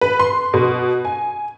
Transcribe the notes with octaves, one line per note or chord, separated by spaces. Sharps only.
B4
C6
B2
G#5